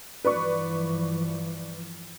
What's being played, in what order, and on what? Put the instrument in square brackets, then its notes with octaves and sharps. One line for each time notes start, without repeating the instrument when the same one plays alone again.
[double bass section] G2 E3 F3 [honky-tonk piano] B4 D5 C#6